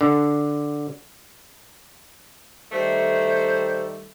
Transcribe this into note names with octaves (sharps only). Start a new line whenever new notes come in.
D3
D#3 G3 A3 C5